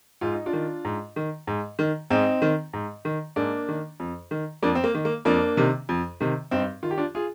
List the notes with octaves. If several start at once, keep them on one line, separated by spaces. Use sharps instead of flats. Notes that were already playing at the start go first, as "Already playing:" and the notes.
G#2 F4
D#4
D4 F4
D#3
G#2
D#3
G#2
D#3
G#2 C4 D#4
D#3
G#2
D#3
G#2 A#3 D4
D#3
F2
D#3
F2 A#3 D4
C4
A#3
D#3
A#3
F2 A#3 D4
C3 D#3
F2
C3 D#3
G2 C4 D#4
D#3 F4
G4
D4 F4
F4 G#4